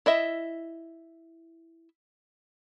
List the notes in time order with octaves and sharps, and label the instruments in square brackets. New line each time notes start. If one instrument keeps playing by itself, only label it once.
[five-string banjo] E4 D#5 E5